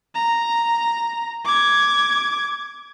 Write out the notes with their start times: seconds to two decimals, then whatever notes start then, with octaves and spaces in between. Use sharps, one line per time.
0.15 A#5
1.44 D6 G#6